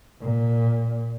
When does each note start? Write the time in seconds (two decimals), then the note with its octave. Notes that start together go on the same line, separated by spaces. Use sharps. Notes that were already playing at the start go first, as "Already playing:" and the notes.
0.22 A#2